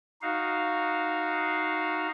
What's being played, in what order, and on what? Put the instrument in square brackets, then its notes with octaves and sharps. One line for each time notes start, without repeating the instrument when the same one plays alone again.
[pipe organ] D#4 F#4 F5